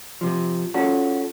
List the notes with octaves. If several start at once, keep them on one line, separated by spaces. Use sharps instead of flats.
C3 F3
C#4 F4 F#4 A4